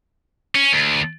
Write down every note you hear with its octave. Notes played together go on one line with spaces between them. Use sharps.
C#4
D2